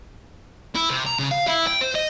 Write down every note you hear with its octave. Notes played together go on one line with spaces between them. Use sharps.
E4
C3
A#5
C#3
F5
E4
G5
C5
D#5